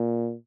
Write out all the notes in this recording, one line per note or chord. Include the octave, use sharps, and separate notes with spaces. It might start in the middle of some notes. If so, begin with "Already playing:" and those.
Already playing: A#2